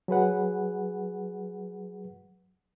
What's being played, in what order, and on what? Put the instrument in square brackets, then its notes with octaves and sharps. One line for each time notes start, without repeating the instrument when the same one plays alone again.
[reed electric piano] F#3 G#4 B4 F#5